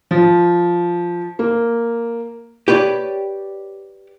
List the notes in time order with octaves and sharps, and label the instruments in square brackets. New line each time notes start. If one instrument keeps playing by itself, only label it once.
[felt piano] F3
A#3
[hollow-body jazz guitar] G4 B4 C#5 D5